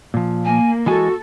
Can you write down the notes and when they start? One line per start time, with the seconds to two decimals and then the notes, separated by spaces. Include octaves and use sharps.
0.14 A#2 F3
0.45 A#3 G#5
0.86 E3 G#3 F#4 A4 G#5